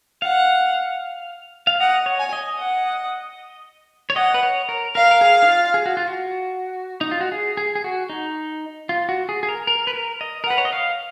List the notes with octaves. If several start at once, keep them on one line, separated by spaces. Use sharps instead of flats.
F5 F#5
F5
D#5 F#5
C#5
G#5
D#5
F#5
C#5
D#5 F#5
B4
C#5
A#4
A#4 F5
A#4
G#4
D#4
F4
G#4
F#4
F4
F#4
D#4
F4
F#4
G#4
G#4
G#4
F#4
D#4
F4
F#4
G#4
G#4
A#4
A#4
B4
A#4
D#5
A#4
B4 F#5
C#5
D#5
F5